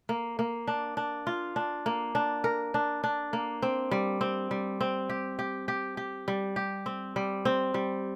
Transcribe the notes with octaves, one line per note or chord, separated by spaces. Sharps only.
A#3
A#3
D4
D4
F4
D4
A#3
D4
A#4
D4
D4
A#3
C4
G3
C4
G3
C4
G4
G4
G4
G4
G3
G4
C4
G3
C4
G3